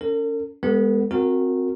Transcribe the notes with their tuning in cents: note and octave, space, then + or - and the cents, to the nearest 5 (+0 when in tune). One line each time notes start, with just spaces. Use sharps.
C#4 +25 A#4 -45
G#3 -25 B3 +0 A4 +45
C4 +0 F#4 -25 A#4 -15